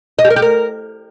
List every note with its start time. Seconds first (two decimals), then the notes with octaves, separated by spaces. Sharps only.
0.19 D#5
0.25 G4
0.30 A#4
0.36 G4
0.42 A#4